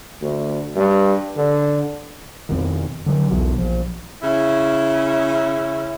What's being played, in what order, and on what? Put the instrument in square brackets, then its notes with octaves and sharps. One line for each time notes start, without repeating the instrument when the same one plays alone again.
[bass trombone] D2
G2
D3
[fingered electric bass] F2 B2 D#3
D3 F#3
B1 E2 B2
A#1 F3
[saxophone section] C#3 C#4 E4